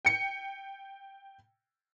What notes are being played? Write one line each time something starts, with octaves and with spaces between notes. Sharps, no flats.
G5 C#7